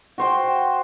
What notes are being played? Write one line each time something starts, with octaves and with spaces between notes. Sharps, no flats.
F#4 C5 G5